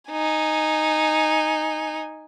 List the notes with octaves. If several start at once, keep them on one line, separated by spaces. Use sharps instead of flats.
D#4 G#5